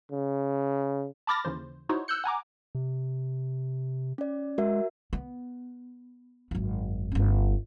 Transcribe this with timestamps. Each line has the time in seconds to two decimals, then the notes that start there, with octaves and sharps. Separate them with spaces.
0.11 C#3
1.27 A5 B5 D6 F6 A6 A#6
1.45 D#2 C#3 E3 C5
1.89 D#4 E4 F#4 C5 C#5
2.08 E6 F#6 G6 C#7
2.24 F#5 G#5 A#5 D6
2.75 C3
4.18 C#4 D5
4.58 G#3 F#4 A#4 E5
5.13 B3
6.51 G#1 F#2
7.12 G1 C#4